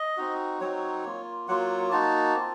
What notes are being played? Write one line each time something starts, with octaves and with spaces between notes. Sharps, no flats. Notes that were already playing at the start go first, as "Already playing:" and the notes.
Already playing: D#5
C4 D#4 F#4
F#3 C4 D#4 F#4 C#5
A#3 F4
F#3 A#3 F4 F#5
A#3 D#4 F#4 A5
C4 F4